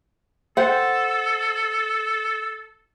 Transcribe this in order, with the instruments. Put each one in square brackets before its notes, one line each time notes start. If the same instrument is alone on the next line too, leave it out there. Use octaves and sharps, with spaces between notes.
[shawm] A4 [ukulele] C5 F#5